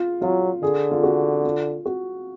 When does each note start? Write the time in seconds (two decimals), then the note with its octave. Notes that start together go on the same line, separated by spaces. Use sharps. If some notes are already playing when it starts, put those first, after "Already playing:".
Already playing: F4
0.22 F#3 F4
0.62 D3 G#4
0.91 F4
1.03 F#4
1.45 F4
1.86 F#4